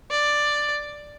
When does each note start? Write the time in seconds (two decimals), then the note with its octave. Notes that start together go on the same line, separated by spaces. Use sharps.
0.11 D5